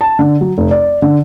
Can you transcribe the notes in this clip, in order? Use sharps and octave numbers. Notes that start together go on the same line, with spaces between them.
A5
D3
F#3
F1
D5
D3